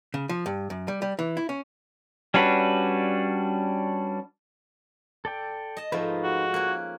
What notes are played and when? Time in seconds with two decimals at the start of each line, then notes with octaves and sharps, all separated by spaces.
0.14 C#3
0.29 F3
0.46 G2
0.70 F#2
0.88 G3
1.02 G3
1.19 E3
1.37 E4
1.49 C#4
2.34 G3 C#4 D4 F#4 B4
5.25 A4 D5 G5
5.77 D#5 A5
5.92 G#2 F3 A3 D#4 F4 B4
6.23 F#4
6.54 A#3 C#4 F#6